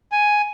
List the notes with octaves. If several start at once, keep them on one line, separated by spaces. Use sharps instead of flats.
G#5